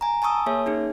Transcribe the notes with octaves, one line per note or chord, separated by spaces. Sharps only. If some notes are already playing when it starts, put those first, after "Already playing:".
G#5 A#5
G#5 A5 C#6 D#6 E6
A#3 G#4 C#5 E5
C#4 D#4 G#4